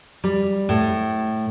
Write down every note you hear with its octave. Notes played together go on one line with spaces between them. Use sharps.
G3
A2